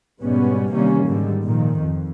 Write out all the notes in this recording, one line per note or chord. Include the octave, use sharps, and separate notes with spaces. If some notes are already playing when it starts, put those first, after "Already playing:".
G#2 B2 G3 B3 C#4
C3 D#3 E3 G3 A#3 C#4
G#2 D3 D#3 G3
A#2 D#3 F3
F2